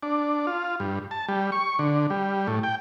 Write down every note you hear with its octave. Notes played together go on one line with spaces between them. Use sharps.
D4
F4
G2
A5
G3
C#6
D3
G3
A2
G5